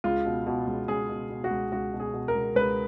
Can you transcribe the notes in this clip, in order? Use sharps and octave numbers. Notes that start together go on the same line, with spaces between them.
C#2 F4
B2
B2
C#2
C#2 G#4
B2
B2
F#4
C#2
C#2 F#4
B2
G#4
B2
A#4
C#2
C#2 B4